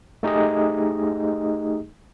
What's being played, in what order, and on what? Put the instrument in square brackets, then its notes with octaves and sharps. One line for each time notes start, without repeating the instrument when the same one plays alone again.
[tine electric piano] A3 D#4 G4 G#4 D#5